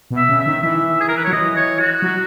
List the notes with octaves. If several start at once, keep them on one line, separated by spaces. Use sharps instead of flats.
B2
E5
C#3
E5
D#3
E3 E5
G#4
A#4
B4
F#3 C#5
E3 D#5
C#5
F#4
F#3